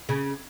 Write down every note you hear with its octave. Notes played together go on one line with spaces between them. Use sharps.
C#3